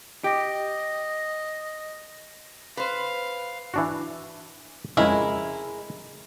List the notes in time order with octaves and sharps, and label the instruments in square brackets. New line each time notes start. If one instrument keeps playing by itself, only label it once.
[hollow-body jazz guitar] G4 [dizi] D#5
[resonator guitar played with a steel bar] B4 C5 [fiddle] F5
[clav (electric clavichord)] E3 D4 F#4
[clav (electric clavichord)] F2 C#3 [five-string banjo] G#3 E4 A#4